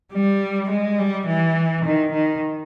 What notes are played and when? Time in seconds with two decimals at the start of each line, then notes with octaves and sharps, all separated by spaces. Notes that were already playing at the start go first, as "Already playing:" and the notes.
0.13 G3
0.70 G#3
0.99 G3
1.27 E3
1.85 D#3
2.13 D#3